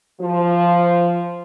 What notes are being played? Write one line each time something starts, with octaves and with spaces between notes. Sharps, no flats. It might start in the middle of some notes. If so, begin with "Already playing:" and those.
F3